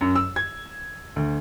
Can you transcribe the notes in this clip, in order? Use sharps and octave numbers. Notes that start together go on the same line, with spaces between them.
F#2
E6
G#6
D2